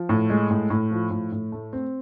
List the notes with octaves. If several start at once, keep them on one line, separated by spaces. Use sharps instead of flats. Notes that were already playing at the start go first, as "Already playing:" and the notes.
Already playing: F3
A2
G#3
A2
A2
F3
A2
A2
A3
C4